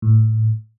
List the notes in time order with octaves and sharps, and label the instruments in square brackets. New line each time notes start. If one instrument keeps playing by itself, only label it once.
[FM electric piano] A2